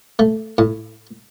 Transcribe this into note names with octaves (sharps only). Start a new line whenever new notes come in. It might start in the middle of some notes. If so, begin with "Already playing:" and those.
A3
A2